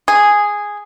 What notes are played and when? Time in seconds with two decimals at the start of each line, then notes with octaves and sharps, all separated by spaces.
0.08 G#4